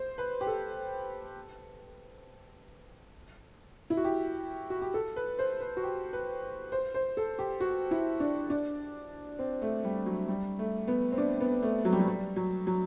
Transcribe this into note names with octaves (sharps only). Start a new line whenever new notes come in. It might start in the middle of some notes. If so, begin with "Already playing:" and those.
Already playing: C5
B4
G4
A4
E4
F#4
G4
F#4
G4
A4
B4
C5
B4
F#4
G4
B4
C5
C5
A4
G4
F#4
E4
D4
D4
C4
A3
G3
F#3
G3
A3
B3
C4
D4
B3
A3
F#3
G3
F#3
G3
F#3
F#3